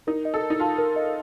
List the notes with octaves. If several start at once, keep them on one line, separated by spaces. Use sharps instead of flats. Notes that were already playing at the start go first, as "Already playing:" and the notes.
D#4 A#4
D#5
A4
A#4
D#4
F4 A5
A#4
D#5